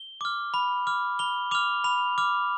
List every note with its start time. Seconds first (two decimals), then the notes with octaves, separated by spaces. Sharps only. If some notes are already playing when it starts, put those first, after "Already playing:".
Already playing: G7
0.21 D6 F6
0.54 B5
0.87 D6 F6
1.19 B5 G7
1.51 D6 F6 F7
1.84 B5 F7
2.18 D6 F6